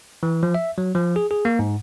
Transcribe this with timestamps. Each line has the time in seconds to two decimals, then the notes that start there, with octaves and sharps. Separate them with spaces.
0.23 E3
0.43 F3
0.54 E5
0.78 F#3
0.95 F3
1.16 G#4
1.31 G#4
1.45 A#3
1.59 G#2